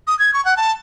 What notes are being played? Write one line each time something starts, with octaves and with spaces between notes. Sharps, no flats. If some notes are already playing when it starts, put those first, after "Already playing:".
D#6
G#6
C#6
F#5
A5